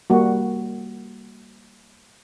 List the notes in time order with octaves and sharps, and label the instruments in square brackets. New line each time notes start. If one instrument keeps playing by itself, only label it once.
[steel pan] G3 A#3 F#4